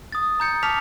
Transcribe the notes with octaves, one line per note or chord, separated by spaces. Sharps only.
D#6 A6
A#5 G6 C#7
A5 D6 F6 B6 F7